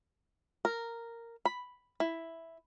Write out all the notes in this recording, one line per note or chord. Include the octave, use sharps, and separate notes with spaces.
A#4
B5
E4